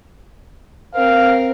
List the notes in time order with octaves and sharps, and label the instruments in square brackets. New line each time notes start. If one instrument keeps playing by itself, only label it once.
[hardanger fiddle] C4 A#4 [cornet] F5